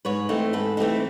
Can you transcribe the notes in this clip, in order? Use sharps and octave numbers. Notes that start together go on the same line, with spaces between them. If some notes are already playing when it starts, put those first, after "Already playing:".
G#2 B4 C#5
E3 A3 C4 D#4
G#2 A4 B4
E3 A3 C4 D#4